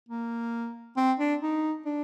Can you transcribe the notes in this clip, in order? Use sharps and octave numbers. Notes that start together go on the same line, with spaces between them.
A#3
C4
D4
D#4
D4